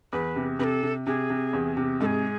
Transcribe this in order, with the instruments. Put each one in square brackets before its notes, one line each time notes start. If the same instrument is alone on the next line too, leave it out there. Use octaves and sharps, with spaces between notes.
[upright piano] E2 [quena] B4
[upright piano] C3
[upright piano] C3 [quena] B4
[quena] A4
[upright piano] C3
[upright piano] C3 [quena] G#4
[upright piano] C3
E2
C3
[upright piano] G#2 [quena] A4
[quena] G#4